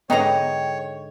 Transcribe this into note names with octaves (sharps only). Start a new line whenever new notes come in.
G#2 D3 G#3 B3 C#5 D#5 G5 A#5